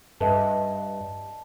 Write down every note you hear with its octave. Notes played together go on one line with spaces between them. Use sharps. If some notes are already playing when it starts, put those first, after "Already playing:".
G2 B4 D#5 E5 A5